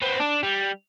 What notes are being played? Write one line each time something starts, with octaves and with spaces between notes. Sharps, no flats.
B3 C4
D4
G3